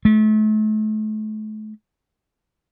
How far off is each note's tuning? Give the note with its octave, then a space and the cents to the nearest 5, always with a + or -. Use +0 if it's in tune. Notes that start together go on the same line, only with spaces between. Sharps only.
A3 -35